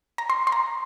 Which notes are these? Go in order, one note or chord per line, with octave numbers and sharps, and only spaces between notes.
A#5
C6
C6
A#5